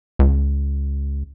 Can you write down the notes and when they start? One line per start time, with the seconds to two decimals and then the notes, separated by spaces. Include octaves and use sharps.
0.19 C#2